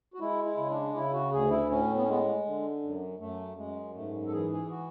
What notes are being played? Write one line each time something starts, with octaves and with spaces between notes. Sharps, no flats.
F#4
G#3 E4
E4
C#3
D4
C#3 E4
F#4
D2 G#4
E4
A2 C#4
B3
C#4
G#3 B3
D3
F#2
F#2 A3
F#2 G#3
G#2 A3
A4
E3 G#4
G#4
F#4